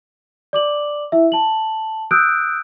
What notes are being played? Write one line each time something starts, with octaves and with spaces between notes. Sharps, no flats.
D5 D6 F#7
E4 E5
A5 F#7
D#6 E6 F#6 G6 D7